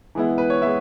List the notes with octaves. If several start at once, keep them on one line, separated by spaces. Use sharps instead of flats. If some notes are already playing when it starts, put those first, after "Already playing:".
E3 G#3 B3 E4
B4
C#5
G#3 B3 E4 E5